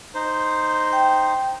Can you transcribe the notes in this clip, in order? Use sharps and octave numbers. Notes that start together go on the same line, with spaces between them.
D#4 C5
G5